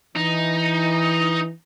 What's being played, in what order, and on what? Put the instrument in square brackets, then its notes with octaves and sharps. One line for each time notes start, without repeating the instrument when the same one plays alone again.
[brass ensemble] E3 [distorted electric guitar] D#4